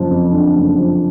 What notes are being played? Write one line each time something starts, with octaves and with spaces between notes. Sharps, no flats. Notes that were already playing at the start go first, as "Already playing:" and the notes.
Already playing: F#1 F3
F2
D3
F#1
F3